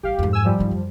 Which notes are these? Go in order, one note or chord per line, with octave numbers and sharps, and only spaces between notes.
A1 G3 G4 F5
F2 G#2
G#5 E6
F3 G3
G#2 D#3
F#2